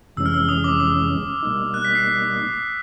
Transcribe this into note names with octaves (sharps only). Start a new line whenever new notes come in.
F2 C3 E3 G#3 C#4 E6
F6
E6
D#6
D6
D#6
B2 G3 A#3 D#4
F#6
B6
C7